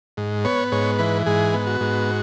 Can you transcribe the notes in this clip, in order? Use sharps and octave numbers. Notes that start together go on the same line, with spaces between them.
G#2
B3 C#5
G#2 C#5
E3 B4
G#2 G#4
B3
F#4
G#2